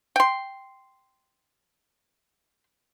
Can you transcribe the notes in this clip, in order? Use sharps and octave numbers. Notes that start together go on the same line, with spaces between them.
G5 C6